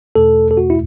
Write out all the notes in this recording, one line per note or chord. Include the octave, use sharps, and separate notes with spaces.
E2 B2 A3 A4
A4
F#4
E4